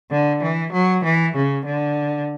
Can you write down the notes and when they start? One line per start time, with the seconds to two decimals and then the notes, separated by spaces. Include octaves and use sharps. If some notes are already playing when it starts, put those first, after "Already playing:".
0.11 D3
0.43 E3
0.73 F#3
1.04 E3
1.35 C#3
1.65 D3